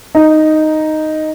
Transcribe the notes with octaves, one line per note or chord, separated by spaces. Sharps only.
D#4